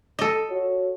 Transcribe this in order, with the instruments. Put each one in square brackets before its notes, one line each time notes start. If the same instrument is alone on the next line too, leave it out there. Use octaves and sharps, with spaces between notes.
[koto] A4 D#5
[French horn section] F#4 C#5